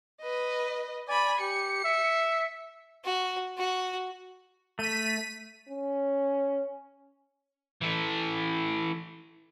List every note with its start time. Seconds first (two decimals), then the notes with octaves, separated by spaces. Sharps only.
0.21 B4 D#5
1.08 D5 G#5 B5
1.41 G4 C#7
1.84 E5
3.04 F#4
3.58 F#4
4.79 A3 B6 D#7
5.69 C#4
7.81 E3 A4